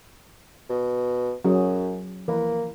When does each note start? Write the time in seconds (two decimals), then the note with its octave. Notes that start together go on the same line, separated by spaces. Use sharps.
0.69 B2
1.45 F#2 F#3 C#4 G#4
2.28 E3 F3 A#3 B4